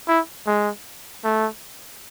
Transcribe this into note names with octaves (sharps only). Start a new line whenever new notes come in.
E4
G#3
A3